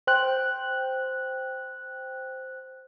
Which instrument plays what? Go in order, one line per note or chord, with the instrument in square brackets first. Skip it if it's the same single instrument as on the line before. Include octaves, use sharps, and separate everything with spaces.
[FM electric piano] C5 G5 F#6